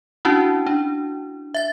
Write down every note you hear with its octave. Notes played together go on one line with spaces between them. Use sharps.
C#4 D4 E4 F#4
D4
E5 A6